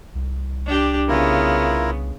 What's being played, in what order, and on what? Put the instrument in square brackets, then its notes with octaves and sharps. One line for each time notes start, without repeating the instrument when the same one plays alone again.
[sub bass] C2
[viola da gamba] D4 G4
[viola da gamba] C#3 B3 [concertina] E4 F4 A#4